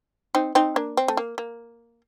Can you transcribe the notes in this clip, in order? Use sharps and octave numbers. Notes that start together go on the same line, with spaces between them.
C4 D#4
C4 D#4
A#3 D4
C4
A3
A#3
A#3